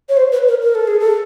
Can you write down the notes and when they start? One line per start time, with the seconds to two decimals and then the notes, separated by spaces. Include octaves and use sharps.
0.09 C#5
0.17 C5
0.32 B4
0.48 A#4
0.63 A#4
0.75 A4
0.87 G#4
1.00 A4